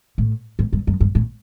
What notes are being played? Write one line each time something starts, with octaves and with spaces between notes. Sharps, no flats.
A2
G#2
G2
F#2
G2
A2